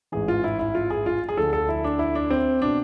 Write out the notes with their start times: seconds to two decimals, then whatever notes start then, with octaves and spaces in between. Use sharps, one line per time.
0.12 A1 G#2 E3 G#4
0.28 F4
0.44 E4
0.59 E4
0.75 F4
0.90 G#4
1.06 F4
1.29 G#4
1.37 D2 D3 F3 A4
1.53 A4
1.69 E4
1.84 D4
1.99 E4
2.15 D4
2.30 C4
2.62 B2 D4